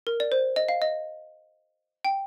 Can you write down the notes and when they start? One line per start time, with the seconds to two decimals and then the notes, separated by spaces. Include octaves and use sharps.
0.07 A#4
0.20 D5
0.32 C5
0.56 D#5
0.69 F5
0.82 D#5
2.05 G5